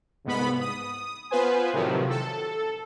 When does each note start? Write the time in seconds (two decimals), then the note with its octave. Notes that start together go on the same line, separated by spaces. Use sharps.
0.25 C2 G#2 B3 B5
0.61 D#6
1.31 B3 F4 B4 C5 G#5
1.73 A2 C3 D#3 F3 F#3
2.10 A4